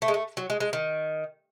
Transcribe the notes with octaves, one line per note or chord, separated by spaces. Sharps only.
A3
G#3
A3
F#3
G#3
G#3
D#3